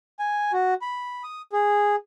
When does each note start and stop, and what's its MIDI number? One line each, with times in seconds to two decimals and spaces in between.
0.19 0.52 80
0.53 0.74 66
0.82 1.23 83
1.24 1.42 87
1.53 1.95 68